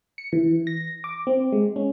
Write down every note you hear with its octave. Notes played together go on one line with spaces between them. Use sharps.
C#7
E3
A#6
D6
C4
G#3
C#4